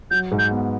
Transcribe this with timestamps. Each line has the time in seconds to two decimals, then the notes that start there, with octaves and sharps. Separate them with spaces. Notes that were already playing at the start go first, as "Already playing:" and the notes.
0.10 F#3 G6
0.31 G#2
0.38 G6
0.51 B3